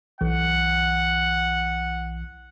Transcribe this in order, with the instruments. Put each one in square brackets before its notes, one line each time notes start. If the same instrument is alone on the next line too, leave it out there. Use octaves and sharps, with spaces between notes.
[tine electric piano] B1 E3 [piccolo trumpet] F#5